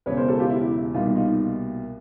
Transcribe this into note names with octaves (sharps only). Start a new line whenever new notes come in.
E1 E2 C#3 B4 C#5
A#4 C5
G4 A4
F4 G4
E4
C2 B2 G3 A#3 D#4 F4
D#4 F4